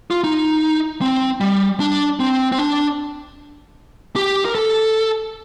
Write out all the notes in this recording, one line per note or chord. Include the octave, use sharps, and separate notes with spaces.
F4
D#4
C4
G3
D4
C4
C4
D4
G4
A#4
A4